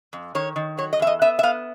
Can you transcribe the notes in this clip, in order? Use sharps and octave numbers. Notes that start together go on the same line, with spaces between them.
F2
D#3 C#5
D#3
F#3 C#5
D#5
E2 E5
D#5
B3 E5
E5
B3 F5